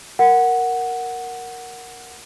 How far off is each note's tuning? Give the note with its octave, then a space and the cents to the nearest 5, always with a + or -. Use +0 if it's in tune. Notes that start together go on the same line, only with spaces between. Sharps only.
A#4 +0 F#5 +0